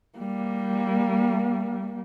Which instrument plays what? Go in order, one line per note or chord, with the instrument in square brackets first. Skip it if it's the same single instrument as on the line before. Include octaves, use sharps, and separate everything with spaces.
[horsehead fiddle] G3 A#3